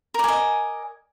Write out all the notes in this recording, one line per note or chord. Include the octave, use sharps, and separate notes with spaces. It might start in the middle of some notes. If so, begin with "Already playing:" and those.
A#4 D5 D#5 G#5